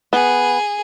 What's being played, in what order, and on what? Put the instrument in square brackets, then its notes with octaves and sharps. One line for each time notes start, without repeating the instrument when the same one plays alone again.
[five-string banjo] B3 [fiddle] G#4